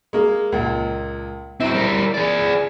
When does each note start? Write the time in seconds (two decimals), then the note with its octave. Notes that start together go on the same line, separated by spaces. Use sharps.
0.13 G#3 A#3
0.52 C#2 A#2
1.60 F#3 C4 E4
1.74 G3 A#4
2.14 G#4 D5